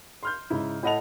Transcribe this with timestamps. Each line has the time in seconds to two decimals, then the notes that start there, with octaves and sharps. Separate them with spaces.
0.23 C6 F6 G6
0.50 G#2 C#3 E4
0.83 A2 E4 D#5 F#5 A5 F7